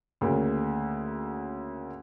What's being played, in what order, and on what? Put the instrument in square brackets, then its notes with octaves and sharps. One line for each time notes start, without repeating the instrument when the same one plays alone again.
[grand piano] D2 C#3 A#3